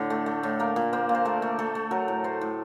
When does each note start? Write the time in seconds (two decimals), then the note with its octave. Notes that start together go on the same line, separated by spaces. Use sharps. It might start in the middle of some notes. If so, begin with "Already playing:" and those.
Already playing: A2 D3
0.10 A3
0.26 A3
0.43 A2
0.59 A#3 A#4
0.76 A#2
0.93 A#3 C5
1.09 A#2
1.15 C5
1.25 A3 A#4
1.42 A3
1.59 A3 A4
1.75 A3
1.91 F#3 A#4
2.08 A2
2.24 A3 C5
2.41 A2